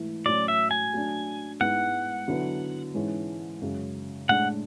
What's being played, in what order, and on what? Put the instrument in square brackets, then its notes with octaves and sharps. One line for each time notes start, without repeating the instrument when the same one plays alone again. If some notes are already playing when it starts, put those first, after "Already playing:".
Already playing: [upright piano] G#2 E3 A3 E4
[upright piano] A2 F#3 C#4 F#4 [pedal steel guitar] D5
[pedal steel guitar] E5
G#5
[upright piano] F#3 A3 D4
[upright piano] G#2 G#3 B3 E4 [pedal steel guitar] F#5
[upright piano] D3 F#3 B3 E4
G#2 E3 G#3 C#4 E4
F#2 C#3 G#3
[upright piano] A2 G#3 D4 [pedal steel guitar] F#5